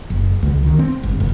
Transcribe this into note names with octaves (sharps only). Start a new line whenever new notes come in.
F#1
C#2
D#3
C4
G1
F1